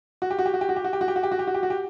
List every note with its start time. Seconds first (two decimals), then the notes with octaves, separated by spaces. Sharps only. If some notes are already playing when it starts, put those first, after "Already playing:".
0.22 F#4
0.31 G4
0.39 F#4
0.46 G4
0.54 F#4
0.61 G4
0.69 F#4
0.76 G4
0.84 F#4
0.93 G4
1.01 F#4
1.08 G4
1.16 F#4
1.23 G4
1.32 F#4
1.39 G4
1.47 F#4
1.54 G4
1.63 F#4
1.70 G4